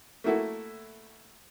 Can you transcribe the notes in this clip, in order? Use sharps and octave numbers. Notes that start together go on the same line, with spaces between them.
A3 A#3 E4 F#4 A4